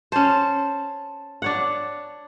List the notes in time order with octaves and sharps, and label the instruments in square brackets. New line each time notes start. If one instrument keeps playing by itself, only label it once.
[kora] C#4 C5 [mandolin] A5
[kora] D4 C#5 F#5